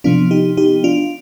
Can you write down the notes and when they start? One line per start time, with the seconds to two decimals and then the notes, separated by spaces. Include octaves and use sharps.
0.04 C3 F3 B3 D4 F4
0.31 D#4 G4
0.57 D#4 G4
0.84 D4 F4